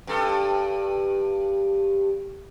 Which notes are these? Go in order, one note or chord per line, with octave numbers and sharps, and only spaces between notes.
G2 A4